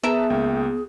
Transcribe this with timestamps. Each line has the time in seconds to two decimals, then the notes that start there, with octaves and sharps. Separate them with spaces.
0.04 B3 G#4 A#4 B4 E5 A5 A#5
0.30 C#2 A#3 G5